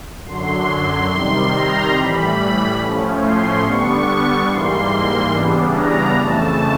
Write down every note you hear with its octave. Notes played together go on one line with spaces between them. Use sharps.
F#2 D3 F#3 C6
C6
C3 D#3 G3 C6
A#5
A2 E3 G3 B5
A2 F3 A3 C#4
C6
D3 G3 B3 D4 C#6
G#2 E3 G3 A#3 C6
C#3 E3 G3 B3 D4
A#5
F2 C#3 E3 A3 A5